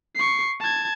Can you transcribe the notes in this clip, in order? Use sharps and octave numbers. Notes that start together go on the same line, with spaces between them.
C#6 C7
A5 G#6